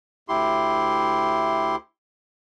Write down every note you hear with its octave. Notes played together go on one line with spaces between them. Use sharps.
D2 E4 G4 C6